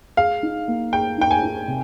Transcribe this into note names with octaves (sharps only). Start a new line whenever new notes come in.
G#4 F5
D#4
A#3
G#4 G5
D#4 G5
G#5
D#4
C3